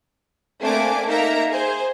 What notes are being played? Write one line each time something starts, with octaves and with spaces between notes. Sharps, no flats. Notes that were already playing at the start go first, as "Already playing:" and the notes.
A3 A#3 C4 D4 G#5 D6
A#3 D#4 A#4 E5 A#5
G#4 C5